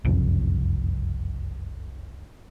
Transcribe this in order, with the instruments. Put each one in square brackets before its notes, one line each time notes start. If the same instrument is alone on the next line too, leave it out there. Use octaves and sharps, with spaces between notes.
[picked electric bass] F#1 C2 F2